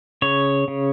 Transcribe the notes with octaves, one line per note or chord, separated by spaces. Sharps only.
C#3 C#5
C#3